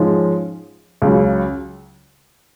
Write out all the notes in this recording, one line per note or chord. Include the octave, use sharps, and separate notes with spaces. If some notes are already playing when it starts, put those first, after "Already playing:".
Already playing: G#2 F3 G#3 C#4
C#2 C#3 F#3